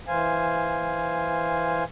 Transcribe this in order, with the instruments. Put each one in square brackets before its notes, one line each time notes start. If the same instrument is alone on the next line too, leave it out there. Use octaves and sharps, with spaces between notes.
[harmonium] E3 C5 F5 G#5